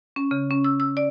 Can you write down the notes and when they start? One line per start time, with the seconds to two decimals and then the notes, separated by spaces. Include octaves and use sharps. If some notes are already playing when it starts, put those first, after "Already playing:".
0.16 C#4
0.31 C#3
0.50 C#4
0.64 E6
0.80 E6
0.97 D5